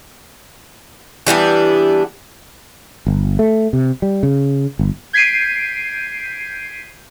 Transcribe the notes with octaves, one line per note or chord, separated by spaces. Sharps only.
E3 G3 B3 D4
G1
A3
C3
G3
C#3
G1
G6 G#6 B6 C7 D7 D#7